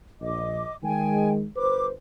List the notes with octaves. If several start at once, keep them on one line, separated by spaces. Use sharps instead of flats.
A#1 D#5 D6
D#3 G#3 G5 G#5
G1 B4 C5 D6